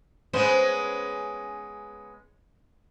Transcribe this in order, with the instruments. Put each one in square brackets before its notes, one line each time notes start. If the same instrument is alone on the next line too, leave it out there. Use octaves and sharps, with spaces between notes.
[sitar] G#3 B3 C#4 [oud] C5